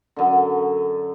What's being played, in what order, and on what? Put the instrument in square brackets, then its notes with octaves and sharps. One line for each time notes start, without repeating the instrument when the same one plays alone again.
[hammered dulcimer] F#2 D3